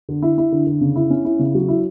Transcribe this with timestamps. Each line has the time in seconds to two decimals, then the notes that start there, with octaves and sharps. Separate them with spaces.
0.09 D3
0.23 E4
0.38 E4
0.52 D3
0.67 D3
0.81 C#3
0.96 E4
1.10 C#4
1.25 E4
1.40 C#3
1.55 F#3
1.68 E4